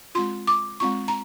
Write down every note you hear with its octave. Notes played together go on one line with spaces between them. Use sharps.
G#3 C4 F4 C6
D6
G#3 C4 F4 C#6
A#5